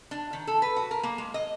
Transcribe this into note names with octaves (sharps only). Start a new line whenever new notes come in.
D4
D#3
A4
B4
F#4
A#4
A#3
G#3
D#5